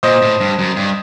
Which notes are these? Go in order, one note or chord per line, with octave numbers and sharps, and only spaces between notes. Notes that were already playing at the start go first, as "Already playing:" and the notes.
A#2 C5 D#5
A2
G2
F#2
G2